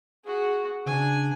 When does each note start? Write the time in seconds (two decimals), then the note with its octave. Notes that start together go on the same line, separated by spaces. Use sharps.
0.25 F#4 G#4
0.86 C#3 D4 G#5